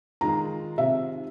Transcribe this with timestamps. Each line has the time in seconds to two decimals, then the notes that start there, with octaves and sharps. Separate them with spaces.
0.21 D#3 G#3 F4 A#5
0.78 C3 E5